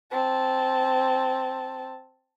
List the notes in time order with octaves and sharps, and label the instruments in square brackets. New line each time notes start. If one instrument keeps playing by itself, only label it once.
[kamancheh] C4 A5